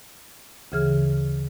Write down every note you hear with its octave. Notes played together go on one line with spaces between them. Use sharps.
D2 C#3 E3 G#4 F6